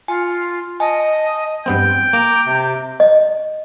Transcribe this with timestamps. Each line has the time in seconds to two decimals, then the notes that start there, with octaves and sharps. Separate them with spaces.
0.08 F4 G#5
0.80 D#5 G#5 A5
1.66 G2 B3 C4 G5
2.13 A#3 A#5 D6
2.46 C3
3.00 D#5